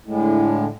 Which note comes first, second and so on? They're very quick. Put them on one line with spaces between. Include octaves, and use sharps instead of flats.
A2 G#3 D3